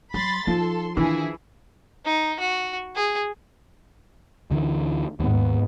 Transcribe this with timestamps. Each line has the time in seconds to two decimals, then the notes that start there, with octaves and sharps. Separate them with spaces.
0.14 F#3 B5 C6 A6
0.47 F3 D#4 A4 C6
0.97 D#3 E3 D4 E4 G#4
2.05 D#4
2.40 F#4
2.96 G#4
4.51 D2 D3 E3
5.20 D#2 G#2 B3